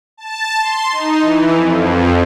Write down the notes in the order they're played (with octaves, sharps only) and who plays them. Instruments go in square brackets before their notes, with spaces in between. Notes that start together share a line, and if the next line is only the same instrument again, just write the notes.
[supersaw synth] A5
C6
D#4
E3
F2